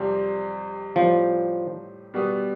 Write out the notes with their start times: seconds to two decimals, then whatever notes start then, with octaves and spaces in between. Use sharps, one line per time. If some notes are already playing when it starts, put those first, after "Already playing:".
Already playing: F2 C3 G3 C4
0.96 A2 F3 G3 C4
2.14 B2 G3 B3